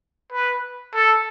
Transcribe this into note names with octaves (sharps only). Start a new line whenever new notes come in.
B4
A4